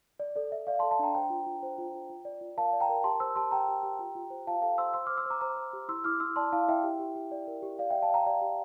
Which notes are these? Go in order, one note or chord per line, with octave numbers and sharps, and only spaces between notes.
D5
A4 D5
D5 E5
D5 F5
A5 C6
A4
A5 C6
D4 G5 A#5
C5 G5 A#5
F4
F4
C5
F4
F4
F4
D5
F4
A#4 F5 A5
D5
G5 A#5
A#4
G4 A5 C6
C5 C6 E6
G4 A5 C6
G4 G5 A#5
G4
G4
F4
F4
C5
F4 F5 A5
A4 F5 A5
C5 C6 E6
C5 C6 E6
C5 D6 F6
C6 E6
C5 A#5 D6
C5 A#5 D6
C5
G4
E4 C6 E6
E4 D6 F6
E4 C6 E6
D5 A5 C6
E4 F5 A5
E4 E5 G5
G4
G4
G4
D5
A#4
G4
D5 F5
E5 G5
D5
F5 A5
D5 G5 A#5
G4 D5 F5
G4